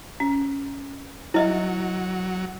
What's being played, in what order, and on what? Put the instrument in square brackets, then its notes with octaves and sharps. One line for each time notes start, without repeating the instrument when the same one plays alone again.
[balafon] C#4
[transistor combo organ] F#3 [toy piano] E4 D#5 E5